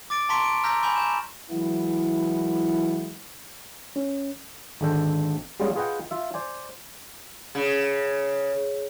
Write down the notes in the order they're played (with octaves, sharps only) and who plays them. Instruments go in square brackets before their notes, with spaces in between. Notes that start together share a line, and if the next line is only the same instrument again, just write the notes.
[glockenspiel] D6 A6 D7
A5 A#5 C6 C#6 B6 D7
D7
A#5 E6 F6 G6 A#6 B6
G#5 B5 C#6 G6 F7
G6 E7
[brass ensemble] E3 F#3 G#3 B3 E4
[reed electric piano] C#4
[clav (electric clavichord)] G#1 D3 G#3 C4 A4 G5
G3 G#3 B3 C#4 F4 G#4
F4 G#4 B4 D#5 F#5 G5
F4 E5
C5 D5 G#5
[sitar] C#3